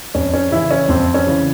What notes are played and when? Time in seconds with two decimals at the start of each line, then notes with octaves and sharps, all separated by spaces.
0.15 F2 C#4
0.34 C#4
0.51 C#3 E3 E4
0.71 C#4
0.88 F2 C4
1.14 C#4
1.27 C#3 E3